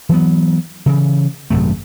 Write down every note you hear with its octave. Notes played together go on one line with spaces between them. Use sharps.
E3 F#3 B3
C#3 E3
G#1 F#2 C3 A3